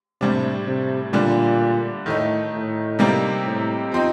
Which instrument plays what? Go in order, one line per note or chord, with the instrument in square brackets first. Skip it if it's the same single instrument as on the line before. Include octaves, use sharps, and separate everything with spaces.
[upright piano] A2 G3 D4 [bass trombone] C3
[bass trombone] C3
[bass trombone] A#2 [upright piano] D3 G3 D4
[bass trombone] A2 [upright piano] D#3 A3 D#4
[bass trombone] A2
[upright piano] C3 G3 A#3 D#4
[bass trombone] A2
[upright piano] F3 C4 D#4